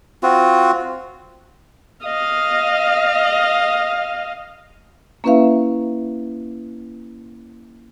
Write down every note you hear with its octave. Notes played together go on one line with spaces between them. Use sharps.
C4 F4 F#4
D#5 F5
A#3 C#4 E4 B4 E5 F5